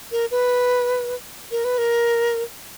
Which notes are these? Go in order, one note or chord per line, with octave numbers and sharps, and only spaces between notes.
A#4
B4
A#4
B4
A#4